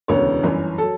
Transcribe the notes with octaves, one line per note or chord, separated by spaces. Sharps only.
E1 D2 C#3 E3 B3 C#5
G1 F#2 E3
F#3 A4